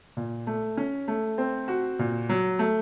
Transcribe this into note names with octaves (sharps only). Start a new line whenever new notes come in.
A#2
A3
C#4
A3
C4
F#4
A#2
F#3
A3